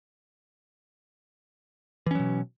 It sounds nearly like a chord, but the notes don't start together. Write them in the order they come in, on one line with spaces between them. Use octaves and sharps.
E3 C#4 F#3 B2